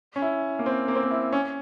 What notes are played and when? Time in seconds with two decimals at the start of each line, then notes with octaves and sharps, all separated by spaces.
0.16 C#4
0.22 E4
0.59 A#3
0.66 C4
0.88 A#3
0.95 C4
1.03 A#3
1.11 E4
1.33 C#4